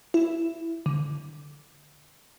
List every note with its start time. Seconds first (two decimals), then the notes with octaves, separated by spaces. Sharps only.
0.14 E4
0.86 D3